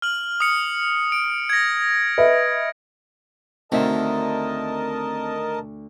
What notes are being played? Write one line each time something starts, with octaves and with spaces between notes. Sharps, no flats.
F6 F#7
D#6 C#7
D7
G#6 A#6
B4 D#5 E5
D2 D#3 C4 A#4 D#5 E5 A5 C6